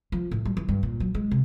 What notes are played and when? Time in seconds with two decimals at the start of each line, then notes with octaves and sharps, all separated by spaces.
0.12 F3
0.31 A2
0.45 G3
0.57 E3
0.69 G2
0.83 A#2
1.00 F#3
1.14 G#3
1.31 C3